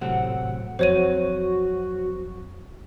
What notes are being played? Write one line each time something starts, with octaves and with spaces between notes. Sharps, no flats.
G#1 A2 C3 F#3 A3 C4 F#5
F2 F#3 C4 F#4 C5 C#5 D#7